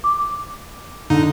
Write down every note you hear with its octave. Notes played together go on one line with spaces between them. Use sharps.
D6
D3 D#4